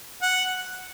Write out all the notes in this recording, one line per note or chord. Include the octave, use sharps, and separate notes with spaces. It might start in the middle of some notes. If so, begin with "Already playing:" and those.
F#5